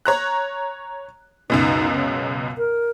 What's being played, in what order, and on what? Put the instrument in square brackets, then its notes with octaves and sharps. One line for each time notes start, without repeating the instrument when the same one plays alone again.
[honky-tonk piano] C#5 A#5 F#6
[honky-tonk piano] C#2 F#2 B2 [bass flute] D#4
[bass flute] C#3
A#4